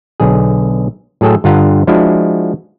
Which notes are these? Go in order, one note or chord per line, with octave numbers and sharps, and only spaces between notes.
B1 D3 G#4
A2 F#3 G#4 A4 G5
G2 D3 F4 F#5 A#5
F3 G#3 D4 E4 F#4